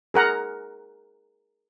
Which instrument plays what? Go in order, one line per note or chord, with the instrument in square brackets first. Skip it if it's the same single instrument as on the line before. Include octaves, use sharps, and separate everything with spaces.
[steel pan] G#4 A#4 F#5 A#5